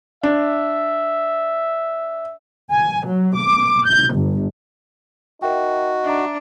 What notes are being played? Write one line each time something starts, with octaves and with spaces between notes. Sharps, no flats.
D4 E5
G#5
F#3
D6
G6
G1
D#4 F#4 A#4 E5 G5
D4 E5 A#5